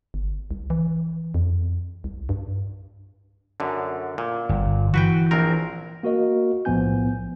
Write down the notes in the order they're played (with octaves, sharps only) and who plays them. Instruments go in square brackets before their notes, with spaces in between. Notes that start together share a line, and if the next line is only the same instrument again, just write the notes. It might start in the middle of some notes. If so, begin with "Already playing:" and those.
[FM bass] G1
C2
E3
F2
C2
G2
[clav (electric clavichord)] F#2 D3
A#2
[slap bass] G1
[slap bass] E3 [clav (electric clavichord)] F#4 B4 G5
[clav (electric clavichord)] A#1 C4 A#4
[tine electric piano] A#3 F#4 A#4 D#5
B1 A2 F3 B3 G#5 G6